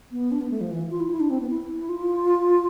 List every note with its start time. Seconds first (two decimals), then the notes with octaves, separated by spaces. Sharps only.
0.12 B3
0.32 D4
0.41 B3
0.50 A3
0.61 F3
0.71 E3
0.91 F4
1.00 E4
1.11 E4
1.20 D4
1.30 C4
1.41 B3
1.50 E4
1.89 F4